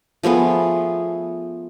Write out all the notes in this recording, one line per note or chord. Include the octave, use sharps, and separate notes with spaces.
F3 A3 B3 G#4